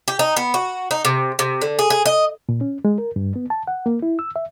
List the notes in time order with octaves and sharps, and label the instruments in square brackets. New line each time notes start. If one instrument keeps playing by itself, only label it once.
[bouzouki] G4
D#4
B3
F#4
D#4
C3
C3
D3
G#4
G#4
D#5
[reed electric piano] A#2
C#4
G#3
A#4
G2
B3
A5
F#5
A#3
E4
E6
E5